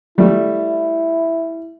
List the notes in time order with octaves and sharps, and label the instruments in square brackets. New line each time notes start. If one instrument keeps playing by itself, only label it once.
[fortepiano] G3 A3 [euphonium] E4